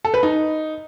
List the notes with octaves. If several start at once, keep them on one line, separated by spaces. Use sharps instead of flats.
A4
B4
D#4